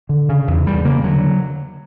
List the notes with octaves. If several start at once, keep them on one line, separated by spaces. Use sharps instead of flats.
D3
C#3
E2
E2 G3
C#3 A#3
D3 F#3